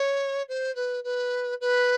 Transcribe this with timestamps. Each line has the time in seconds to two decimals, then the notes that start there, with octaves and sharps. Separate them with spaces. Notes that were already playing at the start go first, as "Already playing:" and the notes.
Already playing: C#5
0.48 C5
0.76 B4
1.04 B4
1.61 B4